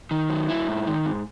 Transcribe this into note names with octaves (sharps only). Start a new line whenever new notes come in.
D#3
F#3
E4
G#2
D#3
G#2